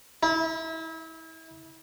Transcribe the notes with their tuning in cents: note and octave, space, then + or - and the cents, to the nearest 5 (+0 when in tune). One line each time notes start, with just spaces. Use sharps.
E4 -30